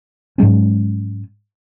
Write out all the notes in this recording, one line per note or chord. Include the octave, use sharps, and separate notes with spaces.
G#2 F#3 G#3 C#4